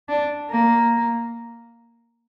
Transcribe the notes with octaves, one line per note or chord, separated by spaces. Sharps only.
D4
A#3